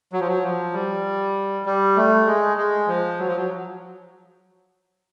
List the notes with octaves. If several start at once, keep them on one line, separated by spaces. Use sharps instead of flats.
F#3
F3
F#3
F3
G3
G3
A3
G#3
G#3
F3
F#3
F3
F#3